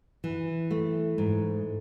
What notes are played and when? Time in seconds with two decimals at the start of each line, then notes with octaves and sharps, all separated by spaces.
0.24 E3
0.71 A3
1.18 G#2